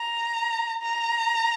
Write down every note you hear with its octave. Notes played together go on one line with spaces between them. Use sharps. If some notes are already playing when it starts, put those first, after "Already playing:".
Already playing: A#5
A#5